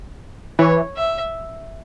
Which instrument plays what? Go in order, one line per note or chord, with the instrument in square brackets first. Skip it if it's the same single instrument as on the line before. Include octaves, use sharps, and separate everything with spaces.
[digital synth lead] E3 [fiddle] C#5
[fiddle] E5